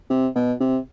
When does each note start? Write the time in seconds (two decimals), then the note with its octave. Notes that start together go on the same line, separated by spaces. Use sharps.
0.10 C3
0.35 B2
0.60 C3